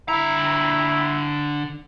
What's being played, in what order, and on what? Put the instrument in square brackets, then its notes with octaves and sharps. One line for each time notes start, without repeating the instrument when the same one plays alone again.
[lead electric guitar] D3 A#5 [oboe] E4